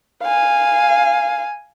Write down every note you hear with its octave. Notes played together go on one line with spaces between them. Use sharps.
F5 G#5